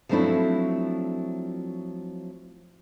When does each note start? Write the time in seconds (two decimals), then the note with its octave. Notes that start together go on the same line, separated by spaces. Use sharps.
0.09 F3 F#3 A3 C4 D4 E4